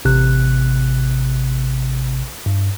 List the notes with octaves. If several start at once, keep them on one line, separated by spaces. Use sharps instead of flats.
A1 C3 F#6
G2